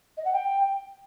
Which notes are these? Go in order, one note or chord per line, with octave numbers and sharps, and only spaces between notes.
D#5
F#5
G5